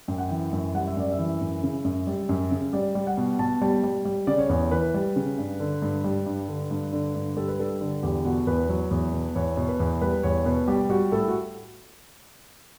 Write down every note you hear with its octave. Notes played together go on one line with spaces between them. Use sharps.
F#2 G5
F#5
E3 G5
F#2
G3 F#5
E5
F#2 D5
E5
E3
F#2
C#3
F#2
G3
F#2
C#3
G3 D5
G3
F#5
B2
B2 A5
G3
G3
G3
C#3 D5
C#5
E2
E3 B4
G3
C#3
G2
D3
G2
G3
G2
D3
G2
D3
G2
G3 A4
B4
G2 A4
D3
E2 G4
B2 F#4
E2 B4
F#3
E2
B2
E2 C#5
B2
B4
E2
G3 B4
E2 C#5
B2 B4
G3 G4
G3 F#4
A2 A4
F#4